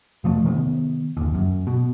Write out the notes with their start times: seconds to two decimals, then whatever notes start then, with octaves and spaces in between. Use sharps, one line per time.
0.24 E1 F3 A3
0.44 C3 D#3 B3
1.17 G1 D#2
1.34 F#2
1.67 B2